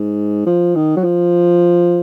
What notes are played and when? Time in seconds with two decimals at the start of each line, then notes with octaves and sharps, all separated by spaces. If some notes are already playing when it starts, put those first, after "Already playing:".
Already playing: G#2
0.47 F3
0.76 D#3
0.97 F#3
1.04 F3